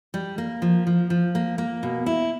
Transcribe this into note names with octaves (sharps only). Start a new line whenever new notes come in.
G3
A#3
F3
F3
F3
A#3
A#3
B2
E4